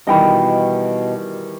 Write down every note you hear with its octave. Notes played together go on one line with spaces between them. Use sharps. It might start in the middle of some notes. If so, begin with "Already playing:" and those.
B2 D#3 E3 G3 D#5 G5 B5